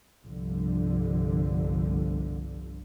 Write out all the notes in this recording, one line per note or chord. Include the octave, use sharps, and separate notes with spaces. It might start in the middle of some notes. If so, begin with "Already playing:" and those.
G1 C2 D3 F3